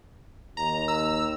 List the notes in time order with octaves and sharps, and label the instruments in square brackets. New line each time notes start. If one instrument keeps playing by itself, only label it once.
[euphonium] D#2 [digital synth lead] A#5
[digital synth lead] E6